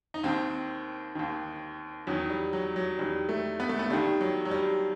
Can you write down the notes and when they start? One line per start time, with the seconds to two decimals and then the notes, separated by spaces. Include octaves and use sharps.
0.14 D#4
0.24 D#2 D#3 C4
1.15 D#2 D#3
2.07 E2 D#3 F#3
2.30 G3
2.53 F#3
2.76 F#3
2.99 E2 D#3 G3
3.29 A3
3.60 B3
3.69 A3
3.79 B3
3.90 D#2 D#3 G3
4.21 F#3
4.45 F#3
4.51 G3